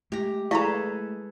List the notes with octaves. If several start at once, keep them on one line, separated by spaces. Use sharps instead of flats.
G#3 A3 G4 A#5
E4 G#4 A4 B4 D5 F5 A#5 C#6